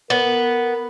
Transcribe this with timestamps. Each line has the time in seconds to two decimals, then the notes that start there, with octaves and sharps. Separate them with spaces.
0.10 B3 A#4